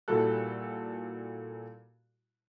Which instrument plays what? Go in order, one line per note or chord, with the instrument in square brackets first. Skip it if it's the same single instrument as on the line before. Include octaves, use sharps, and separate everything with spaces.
[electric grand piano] A#2 G3 E4 F#4 A4 F#6